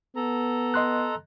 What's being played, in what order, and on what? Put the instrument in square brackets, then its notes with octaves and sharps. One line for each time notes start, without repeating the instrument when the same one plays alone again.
[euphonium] B3 [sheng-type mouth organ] A4 A#5
[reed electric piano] D#5 C6 F#6